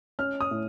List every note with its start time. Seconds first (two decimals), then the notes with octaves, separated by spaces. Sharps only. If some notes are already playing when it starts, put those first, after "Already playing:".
0.19 C#4 F6
0.41 D#6
0.51 A2